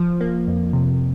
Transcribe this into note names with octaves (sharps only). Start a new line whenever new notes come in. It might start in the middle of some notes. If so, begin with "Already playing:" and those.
Already playing: F3
A#3
F2
C3